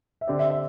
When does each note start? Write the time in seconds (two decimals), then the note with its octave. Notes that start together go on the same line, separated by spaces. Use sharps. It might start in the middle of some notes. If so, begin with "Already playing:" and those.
0.21 E5
0.27 D3 C4 G4 D5
0.39 E5
0.51 E5